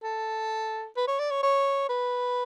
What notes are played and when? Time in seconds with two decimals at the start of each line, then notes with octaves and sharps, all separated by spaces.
0.03 A4
0.97 B4
1.08 C#5
1.19 D5
1.30 C#5
1.43 C#5
1.89 B4